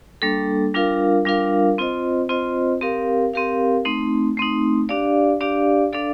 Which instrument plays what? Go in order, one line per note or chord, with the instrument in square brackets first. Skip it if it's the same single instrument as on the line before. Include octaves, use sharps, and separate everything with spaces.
[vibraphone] G3 A#3 D4 A4
G3 D4 F4 A#4 F5
G3 D4 F4 A#4 F5
C4 F4 C5 D#5
C4 F4 C5 D#5
C4 G4 A#4 F5
C4 G4 A#4 F5
A3 C4 D#4
A3 C4 D#4
D4 G4 D5 F5
D4 G4 D5 F5
D4 A4 D5 F5